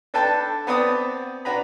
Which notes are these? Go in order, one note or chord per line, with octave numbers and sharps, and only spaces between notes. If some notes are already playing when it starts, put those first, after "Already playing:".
D4 A4 B4 G5 A5
B3 C4 B4 C5 D5 D#6
D4 F#4 B4 A#5 B5